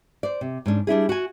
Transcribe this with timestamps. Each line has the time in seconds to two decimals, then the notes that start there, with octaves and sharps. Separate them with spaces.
0.23 C5 D5
0.41 C3
0.66 G#2 C#4 D4
0.87 G3 D4 E4 G#4
1.09 F#4 G#5